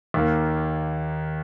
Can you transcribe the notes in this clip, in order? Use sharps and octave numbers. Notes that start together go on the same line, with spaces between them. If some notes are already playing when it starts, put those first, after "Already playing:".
D#2 D#3 A#3